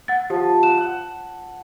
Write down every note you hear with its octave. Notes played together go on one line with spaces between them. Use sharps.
F#5 A6
F3 G4
F#5 E7
F#5